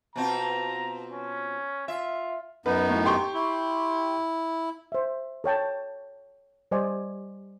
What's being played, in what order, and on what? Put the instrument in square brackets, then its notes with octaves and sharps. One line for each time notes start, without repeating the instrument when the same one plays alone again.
[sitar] B2 C4 F4 [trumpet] A#5
[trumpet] C#4
[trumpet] F4 [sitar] E5
[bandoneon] F#2 B3 D#4 [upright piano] B4
[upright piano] A2
G4 C6 C#6
[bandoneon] E4
[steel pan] C5 E5
A4 C#5 G5 A5
G3 C5 D5 D#5 G#5